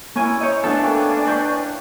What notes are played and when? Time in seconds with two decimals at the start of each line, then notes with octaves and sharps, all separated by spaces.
0.16 A#3 C#4 E4 G#5
0.41 C#5 D#5 E5 A#5 G6
0.64 A3 B3 D4 A4 G#5
0.83 A#3 C#4 G5
1.27 B4 C#6 G6